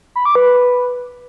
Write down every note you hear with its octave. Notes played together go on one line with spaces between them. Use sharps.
B5
D6
B4